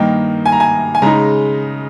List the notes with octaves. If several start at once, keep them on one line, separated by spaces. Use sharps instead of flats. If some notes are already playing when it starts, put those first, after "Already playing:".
Already playing: G2 D#3 A#3 D#4 G5
G#5
A#5
G#5
G#5
C#3 G#3 D#4 A#5